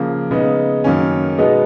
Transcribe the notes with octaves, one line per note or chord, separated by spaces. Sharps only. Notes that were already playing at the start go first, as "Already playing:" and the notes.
Already playing: C#3 F3 A#3
C#3 G#3 B3 D#4
F#2 D#3 A#3 C#4
B2 G#3 B3 D#4